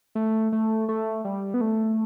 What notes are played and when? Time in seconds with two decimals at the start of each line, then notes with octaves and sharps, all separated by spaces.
0.15 A3
0.52 A3
0.89 A3
1.25 G3
1.54 B3
1.61 A3